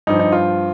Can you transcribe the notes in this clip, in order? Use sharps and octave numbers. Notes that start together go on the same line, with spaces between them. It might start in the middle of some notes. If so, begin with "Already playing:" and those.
G2 F3 D#4
D#4
F4